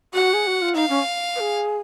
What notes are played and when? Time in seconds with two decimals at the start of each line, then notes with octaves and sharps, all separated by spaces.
0.14 F#4 F#5
0.34 G#4
0.47 F#4
0.62 F4
0.75 D#4 F5
0.89 C#4
1.36 B4
1.40 G#4